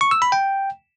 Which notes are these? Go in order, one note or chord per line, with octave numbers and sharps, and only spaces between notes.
C#6
E6
B5
G5